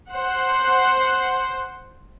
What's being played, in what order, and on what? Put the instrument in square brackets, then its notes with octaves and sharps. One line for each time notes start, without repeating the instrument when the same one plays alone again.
[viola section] C5 F#5